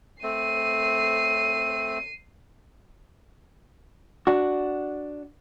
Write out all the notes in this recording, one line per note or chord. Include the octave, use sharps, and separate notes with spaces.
A3 C4 C7 D#7
D4 F#4